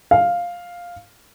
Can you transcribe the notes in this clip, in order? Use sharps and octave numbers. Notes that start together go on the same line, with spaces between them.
F5